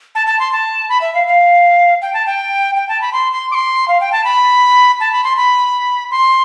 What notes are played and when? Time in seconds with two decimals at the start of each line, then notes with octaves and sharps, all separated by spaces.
0.15 A5
0.27 A5
0.40 C6
0.52 A5
0.89 B5
1.01 E5
1.14 F5
1.27 F5
2.02 G5
2.14 A5
2.26 G5
2.76 G5
2.89 A5
3.01 B5
3.13 C6
3.32 C6
3.51 D6
3.55 C6
3.88 F5
4.01 G5
4.12 A5
4.24 B5
5.00 A5
5.13 B5
5.24 C6
5.37 B5
6.11 C6